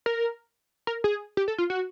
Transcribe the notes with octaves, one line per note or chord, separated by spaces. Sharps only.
A#4
A#4
G#4
G4
A4
F4
F#4